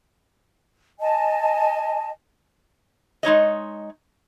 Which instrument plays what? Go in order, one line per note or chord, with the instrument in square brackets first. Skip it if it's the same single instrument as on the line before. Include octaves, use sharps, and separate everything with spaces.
[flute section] D#5 G#5 A5
[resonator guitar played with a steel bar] G#3 D#4 C#5 D#5